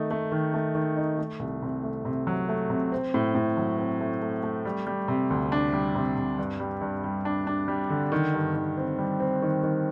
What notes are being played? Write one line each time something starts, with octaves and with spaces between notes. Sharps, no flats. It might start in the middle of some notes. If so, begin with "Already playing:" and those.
Already playing: D#3 A3 D#4
A3
D#3
A3
D#3
D#4
A3
C2
C3
A3
C3
F#3
A3
C3
C4
A2
A2
F#3
C4
A3
A3
A3
G3
G3
C3
D2
D4
G3
C3
C3
G2
G3
G2
G3
D4
D4
G3
D3
D#3
G2
D#3
C4
G3
C4
D#3
D#3